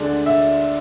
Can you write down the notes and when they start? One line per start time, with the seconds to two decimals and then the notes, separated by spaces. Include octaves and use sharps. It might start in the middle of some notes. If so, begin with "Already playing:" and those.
Already playing: D2 D3 G#3 D5
0.26 E5